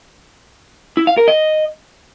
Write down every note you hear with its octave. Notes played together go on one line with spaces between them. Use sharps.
E4
F5
A#4
D#5